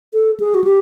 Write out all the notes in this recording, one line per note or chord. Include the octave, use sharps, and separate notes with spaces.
A4
G#4
F#4
G4